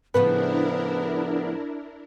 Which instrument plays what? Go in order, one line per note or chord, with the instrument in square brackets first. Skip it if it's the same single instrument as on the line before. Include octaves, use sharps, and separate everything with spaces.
[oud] A2 C#3 F3 [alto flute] B3 [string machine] D4 E4 A#4 [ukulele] B4